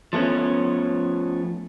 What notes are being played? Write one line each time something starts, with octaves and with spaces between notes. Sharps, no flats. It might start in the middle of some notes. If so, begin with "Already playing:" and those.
F3 A3 B3 C#4